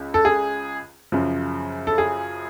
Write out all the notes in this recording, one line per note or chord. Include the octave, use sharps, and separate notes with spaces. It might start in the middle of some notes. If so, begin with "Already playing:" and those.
Already playing: C#2 C#3
A4
G#4
F#2 C#3 F3
A4
G#4